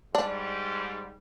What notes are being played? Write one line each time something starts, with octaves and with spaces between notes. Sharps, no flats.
G#2 G3 D4